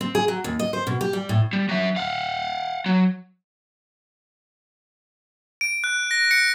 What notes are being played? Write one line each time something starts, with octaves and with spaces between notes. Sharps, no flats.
C4
G#4
F#3
D#2
D#5
C5
B2
G4
G3
A2
G3
F#3 E5
F5 F#5
F#3
D7
F#6
A#6
C#7